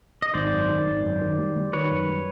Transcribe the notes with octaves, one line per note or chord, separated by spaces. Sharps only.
D#5
G#1 C5 D5
F#2
D#3
G#1
F#2
D#3
G3
G3
D#3 B4 C#5
F#2
G3